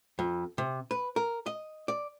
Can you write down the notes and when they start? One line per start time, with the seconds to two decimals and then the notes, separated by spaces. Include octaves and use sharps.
0.19 F2
0.58 C3
0.91 B4
1.16 A#4
1.46 D#5
1.88 D5